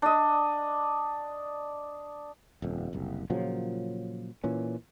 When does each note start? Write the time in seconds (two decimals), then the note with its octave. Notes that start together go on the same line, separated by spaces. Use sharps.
0.02 D4 D#5
2.62 D#1 F2
2.93 F#1 C2
3.30 A#2 C#3 F3 F#3
4.44 A#2 E3 C#4